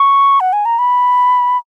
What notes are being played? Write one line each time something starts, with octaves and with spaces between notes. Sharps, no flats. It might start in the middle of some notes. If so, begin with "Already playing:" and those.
Already playing: C#6
F#5
G#5
A#5
B5